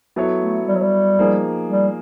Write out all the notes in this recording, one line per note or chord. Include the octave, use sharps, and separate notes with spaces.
F#3 B3 E4 A4 C#5
A3
G3
F#3
G3
F3 A#3 D#4 G#4
G3